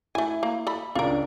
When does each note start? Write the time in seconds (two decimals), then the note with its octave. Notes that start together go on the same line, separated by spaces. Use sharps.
0.15 A3 E4 G#5
0.43 A#3
0.67 A4 B5
0.95 C#2 D4 F4 A#4